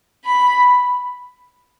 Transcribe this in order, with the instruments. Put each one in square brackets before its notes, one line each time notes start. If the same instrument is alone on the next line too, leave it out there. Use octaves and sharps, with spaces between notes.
[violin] B5